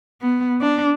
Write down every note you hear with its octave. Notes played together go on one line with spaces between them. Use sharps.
B3
D4